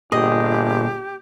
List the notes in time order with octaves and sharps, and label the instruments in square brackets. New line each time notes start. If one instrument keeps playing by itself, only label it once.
[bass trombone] G1 [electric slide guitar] A#2 G#4 [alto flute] G4 [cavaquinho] D#5